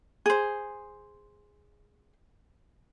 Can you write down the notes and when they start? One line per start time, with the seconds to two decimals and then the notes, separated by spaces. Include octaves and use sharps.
0.26 G#4 C5